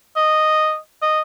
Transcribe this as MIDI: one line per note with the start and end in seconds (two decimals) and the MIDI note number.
0.17 0.77 75
1.03 1.21 75